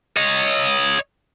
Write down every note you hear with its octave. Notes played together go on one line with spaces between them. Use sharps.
C#5 D#5